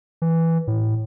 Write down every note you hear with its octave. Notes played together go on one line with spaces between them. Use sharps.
E3
A2